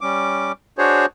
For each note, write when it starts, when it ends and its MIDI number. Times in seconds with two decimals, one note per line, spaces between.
0.01 0.52 55
0.01 0.52 61
0.01 0.52 86
0.78 1.06 62
0.78 1.06 66
0.78 1.06 68
0.78 1.06 72
0.78 1.06 73